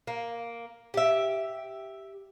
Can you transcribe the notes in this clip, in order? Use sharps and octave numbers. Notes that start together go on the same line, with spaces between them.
A#3
G4 E5